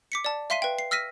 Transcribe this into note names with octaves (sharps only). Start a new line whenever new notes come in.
D6 B6 C#7
D5 A5
E5 F5 C6 B6 C7 D#7
B4 G5
C7
E6 F6 A#6 B6 D#7